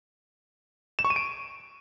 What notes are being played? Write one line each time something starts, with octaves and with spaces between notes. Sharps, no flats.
E7
C#6
D#7
D7